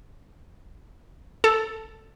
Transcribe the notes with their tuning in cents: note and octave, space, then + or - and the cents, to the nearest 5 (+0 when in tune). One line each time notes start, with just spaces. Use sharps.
A4 +5